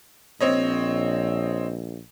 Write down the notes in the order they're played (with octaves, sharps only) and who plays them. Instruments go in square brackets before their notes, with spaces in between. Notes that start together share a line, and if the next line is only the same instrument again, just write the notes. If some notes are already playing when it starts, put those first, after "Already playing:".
[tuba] A#1 [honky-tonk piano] C4 C#5 D#5